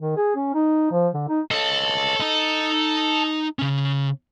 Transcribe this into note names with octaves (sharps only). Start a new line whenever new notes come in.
D#3
G#4
C#4
D#4
F3
D3
D#4
A4 C#5 D#5
D#4 D#5
C#3 C#4